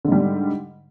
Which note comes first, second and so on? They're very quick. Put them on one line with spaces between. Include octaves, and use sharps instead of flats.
D3 G#2 G3